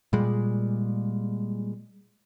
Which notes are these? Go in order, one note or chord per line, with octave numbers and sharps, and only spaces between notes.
A#2 G3 G#3